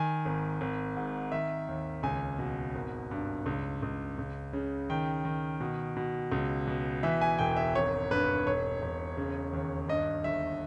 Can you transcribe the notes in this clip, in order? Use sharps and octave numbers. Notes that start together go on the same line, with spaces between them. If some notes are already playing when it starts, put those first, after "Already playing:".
Already playing: D#3 G#5
G#1
G#1
G#2
D#3 E5
D#2
C#2 G#5
B2
G#1
G2
C#2
C#2
C#2
C#3
D#3 G5
D#3
B2
B2
C#2
B2
E3 E5
G#5
E1 G5
E5
G#1 C#5
G2 B4
E1 C#5
E1
C#3
D#2
G2 D#5
G1 E5